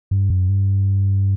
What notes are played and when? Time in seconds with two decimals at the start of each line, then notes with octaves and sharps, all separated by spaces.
0.11 G2
0.30 F#2
0.49 G2